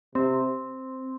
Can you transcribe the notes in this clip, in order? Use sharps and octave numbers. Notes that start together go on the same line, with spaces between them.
C3 C4